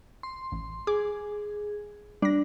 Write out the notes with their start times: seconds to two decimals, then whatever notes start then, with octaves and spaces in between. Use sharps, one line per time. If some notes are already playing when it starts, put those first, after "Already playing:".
0.23 C6
0.52 A1
0.87 G#4 D6
2.22 G3 D4 A#6